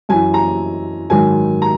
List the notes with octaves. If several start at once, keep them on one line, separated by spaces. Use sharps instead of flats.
F#2 E3 G#5
A#5
G#2 D#3 F#3 G#5
A#5